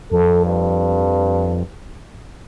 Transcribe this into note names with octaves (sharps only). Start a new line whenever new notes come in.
F2 A4
G2